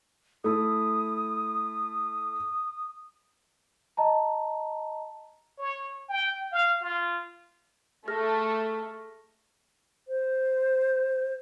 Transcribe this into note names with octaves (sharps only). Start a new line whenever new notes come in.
A3 E4 D#6
D#5 A5 A#5
C#5
G5
F5
F4
A3 G#4 F6 A#6
C5